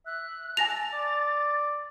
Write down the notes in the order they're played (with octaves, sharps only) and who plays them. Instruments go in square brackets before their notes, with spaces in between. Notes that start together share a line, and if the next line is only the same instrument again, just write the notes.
[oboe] E5 [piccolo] F#6
[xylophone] G#5 A#6 F7 [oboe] A5 [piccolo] A6
[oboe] D5